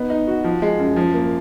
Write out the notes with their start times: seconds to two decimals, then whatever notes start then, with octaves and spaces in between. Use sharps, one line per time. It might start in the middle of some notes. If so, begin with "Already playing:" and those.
Already playing: B3 D#4
0.10 D#4
0.27 F#4
0.44 F3
0.62 G#3
0.79 F#2
0.96 F3
1.14 A#3